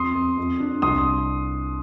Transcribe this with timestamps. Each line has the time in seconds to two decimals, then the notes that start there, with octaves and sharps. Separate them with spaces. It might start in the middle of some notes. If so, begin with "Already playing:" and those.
Already playing: F2 C6 D#6
0.15 F2
0.38 F2
0.60 D4
0.82 C2 C6 D#6